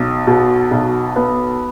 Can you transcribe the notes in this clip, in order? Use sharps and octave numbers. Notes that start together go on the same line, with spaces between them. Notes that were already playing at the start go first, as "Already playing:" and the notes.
Already playing: B1
B2
B1
B3